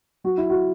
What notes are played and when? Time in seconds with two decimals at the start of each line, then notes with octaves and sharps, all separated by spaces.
0.24 F#3 F#4
0.38 E4
0.50 F#4